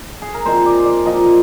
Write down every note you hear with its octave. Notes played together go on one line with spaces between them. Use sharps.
G#4
A#4
A#2 F3 C4 D#4 C5
D5
D5
A#2 F3 C4 D#4 D#5